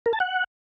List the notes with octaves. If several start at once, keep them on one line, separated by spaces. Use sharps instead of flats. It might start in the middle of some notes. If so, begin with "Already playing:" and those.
A#4
A5
F#5